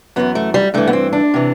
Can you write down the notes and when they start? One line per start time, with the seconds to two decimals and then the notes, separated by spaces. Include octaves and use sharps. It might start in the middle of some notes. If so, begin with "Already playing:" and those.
0.16 F#2 E3 B3
0.35 A3
0.54 G3
0.74 G2 E3 A3
0.87 B3
0.93 C4
1.13 D4
1.34 C3 E3